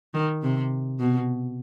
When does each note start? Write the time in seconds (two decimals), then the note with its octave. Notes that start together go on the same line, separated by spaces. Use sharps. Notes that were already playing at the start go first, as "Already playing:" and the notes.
0.14 D#3
0.43 C3
1.00 B2